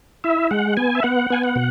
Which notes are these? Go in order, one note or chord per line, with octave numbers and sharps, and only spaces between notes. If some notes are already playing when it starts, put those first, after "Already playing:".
E4 E5
G#3 F#5
B3 G#5
E5
B3 F#5
B3 G#5
F#5
B2